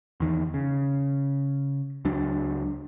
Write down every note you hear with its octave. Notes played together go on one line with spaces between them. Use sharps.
E2 D#3
C#3
C#2 F#3 D4